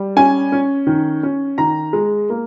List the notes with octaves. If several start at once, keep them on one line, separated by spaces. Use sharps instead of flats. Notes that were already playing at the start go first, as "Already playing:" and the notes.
Already playing: G3
C#4 G#5
C#4
D#3
C#4
D#3 A#5
G#3
A#3